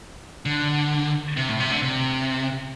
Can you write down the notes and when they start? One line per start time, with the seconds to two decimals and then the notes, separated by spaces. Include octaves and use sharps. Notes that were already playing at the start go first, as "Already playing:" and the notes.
0.46 D3
1.37 C3
1.48 A2
1.60 C3
1.71 D3
1.83 C3